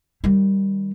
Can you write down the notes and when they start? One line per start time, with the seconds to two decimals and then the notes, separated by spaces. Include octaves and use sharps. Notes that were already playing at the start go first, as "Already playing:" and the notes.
0.24 D#3 G3